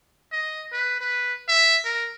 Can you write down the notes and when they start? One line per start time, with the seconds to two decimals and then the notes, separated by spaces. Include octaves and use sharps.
0.32 D#5
0.72 B4
1.01 B4
1.48 E5
1.84 A#4